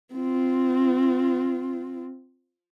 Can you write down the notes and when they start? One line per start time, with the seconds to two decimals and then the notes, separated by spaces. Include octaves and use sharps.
0.13 C4 F4